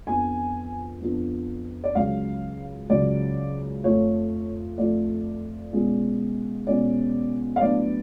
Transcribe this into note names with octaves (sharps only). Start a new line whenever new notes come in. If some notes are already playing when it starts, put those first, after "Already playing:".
F2 F3 B3 D4 G#5
F2 F3 B3 D4
D5
C#2 C#3 F#3 F5
C#2 C#3 F#3 D5
F2 F3 A3 F4 C#5
F2 F3 A3 F4 D5
B2 G#3 C#4 F4
B2 G#3 C#4 F4 D5
F5
A2 F#3 B3 D4 D5